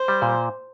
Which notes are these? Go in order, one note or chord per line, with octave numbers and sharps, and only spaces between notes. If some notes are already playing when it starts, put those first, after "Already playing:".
Already playing: C5
G3
A#2